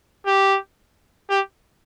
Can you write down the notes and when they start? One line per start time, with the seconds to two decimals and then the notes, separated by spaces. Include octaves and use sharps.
0.27 G4
1.30 G4